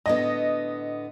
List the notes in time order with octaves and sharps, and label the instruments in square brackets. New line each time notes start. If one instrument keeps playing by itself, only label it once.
[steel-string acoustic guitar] A2 D3 B3 [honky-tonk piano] D#5